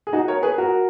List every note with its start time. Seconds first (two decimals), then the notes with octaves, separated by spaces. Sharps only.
0.07 G#4
0.13 D#4 F#4
0.28 A#4 C#5
0.43 G#4 B4
0.58 F#4 A#4